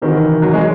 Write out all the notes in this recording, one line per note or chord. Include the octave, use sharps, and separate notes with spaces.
C3 D#3 E3 C4 D#4 F#4
F#3
G#3